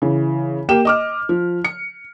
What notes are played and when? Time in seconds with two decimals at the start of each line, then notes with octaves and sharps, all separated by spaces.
0.02 C#3 E3
0.69 A#3 G4 G5 E7
0.85 D#5 D6 F6
1.29 F3
1.65 C#7